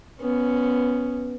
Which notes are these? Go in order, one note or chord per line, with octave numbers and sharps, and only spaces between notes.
B3 C#4